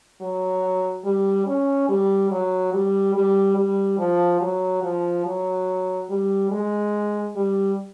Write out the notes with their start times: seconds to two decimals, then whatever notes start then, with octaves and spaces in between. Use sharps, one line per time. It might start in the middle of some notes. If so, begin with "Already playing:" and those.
0.21 F#3
1.05 G3
1.47 C#4
1.89 G3
2.31 F#3
2.73 G3
3.15 G3
3.57 G3
3.99 F3
4.41 F#3
4.83 F3
5.25 F#3
6.09 G3
6.51 G#3
7.35 G3